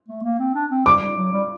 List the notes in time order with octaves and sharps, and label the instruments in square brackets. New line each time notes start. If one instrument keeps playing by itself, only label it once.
[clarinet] A3
A#3
C4
D4
C4
[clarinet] G3 [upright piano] D6
[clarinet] G3
F#3
G3